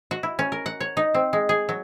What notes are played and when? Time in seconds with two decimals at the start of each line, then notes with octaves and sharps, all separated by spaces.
0.11 F#4
0.23 E4
0.39 C#4
0.52 A#4
0.66 F#5
0.80 C#5
0.97 D#4
1.14 C4
1.33 G#3
1.49 G#4
1.69 F#3